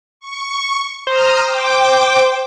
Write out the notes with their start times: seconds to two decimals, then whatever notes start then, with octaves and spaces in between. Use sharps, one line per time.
0.20 C#6
1.07 C5 A#5 D#6 F6
1.44 G5 D6